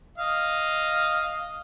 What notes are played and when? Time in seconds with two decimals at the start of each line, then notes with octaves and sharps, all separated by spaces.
0.18 D#5 F5